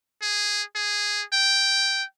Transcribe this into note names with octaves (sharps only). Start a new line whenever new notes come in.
G#4
G#4
G5